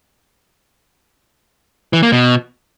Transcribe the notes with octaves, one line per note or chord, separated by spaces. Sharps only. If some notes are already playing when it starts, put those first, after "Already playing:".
E3
A#3
B2